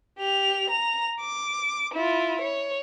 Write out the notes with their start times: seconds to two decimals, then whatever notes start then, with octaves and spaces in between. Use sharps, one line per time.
0.19 G4 F7
0.70 A#5 F7
1.20 D6
1.94 E4 F4
2.41 C#5